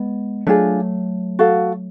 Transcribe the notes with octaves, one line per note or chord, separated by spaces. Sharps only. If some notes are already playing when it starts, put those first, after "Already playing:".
Already playing: G#3 B3
F#3 A3 D4 F4 G#4
F#4 A4 F5